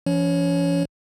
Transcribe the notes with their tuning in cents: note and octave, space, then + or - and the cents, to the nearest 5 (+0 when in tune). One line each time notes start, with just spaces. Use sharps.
F3 -45 C#4 +35 C#5 +0